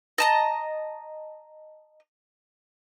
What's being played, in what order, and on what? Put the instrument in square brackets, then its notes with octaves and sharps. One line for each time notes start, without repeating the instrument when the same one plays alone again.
[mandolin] D#5 A5 A#5